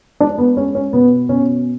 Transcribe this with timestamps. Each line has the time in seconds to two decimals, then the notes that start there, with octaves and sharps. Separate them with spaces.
0.20 G#3 D4
0.38 B3
0.57 G#3 C#4
0.75 C#4
0.93 B2 B3
1.29 B2 C#4